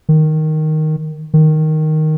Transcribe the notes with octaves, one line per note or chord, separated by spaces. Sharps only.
D#3
D#3